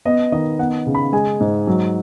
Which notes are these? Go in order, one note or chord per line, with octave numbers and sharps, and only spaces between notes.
B3 D#5
D#3 D#5
B3 F#5
C#3
B5
G#3 G#5
G#2
F#3